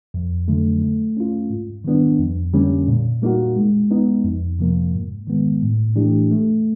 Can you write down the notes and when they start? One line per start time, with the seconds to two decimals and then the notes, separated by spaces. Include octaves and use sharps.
0.14 F2
0.48 D3 F#3 A3
0.82 A3
1.17 C#4 F4
1.50 G#2
1.84 D#3 G3 B3 D4
2.19 F2
2.54 D3 G3 A#3 C#4
2.88 A#2
3.22 G3 A#3 D#4 F#4
3.56 G#3
3.91 B3 D#4
4.24 F2
4.59 C3 F3 A#3
4.93 G#2
5.27 D#3 G#3 B3
5.62 A2
5.96 E3 A3 D4 G4
6.31 A3